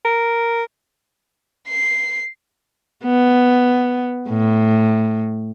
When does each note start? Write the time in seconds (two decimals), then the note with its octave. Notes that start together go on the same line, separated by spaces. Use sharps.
0.05 A#4
1.68 C7
3.04 B3
4.29 A2